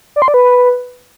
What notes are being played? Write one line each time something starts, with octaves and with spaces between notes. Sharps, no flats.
D5
C6
D5
B4